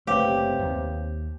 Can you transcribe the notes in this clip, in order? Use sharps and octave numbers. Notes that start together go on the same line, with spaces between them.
F#1 C3 A3 G4 B4 C#5 F5
D#2